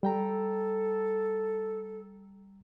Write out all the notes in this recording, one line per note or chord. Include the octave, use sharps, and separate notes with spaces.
G3 A4 G5 A#5